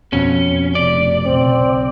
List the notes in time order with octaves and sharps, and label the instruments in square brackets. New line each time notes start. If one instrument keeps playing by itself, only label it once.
[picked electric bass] F2 B2 [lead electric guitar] C#4
[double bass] F1 C3 [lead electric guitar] D5
[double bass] B1 C#3 [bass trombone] C4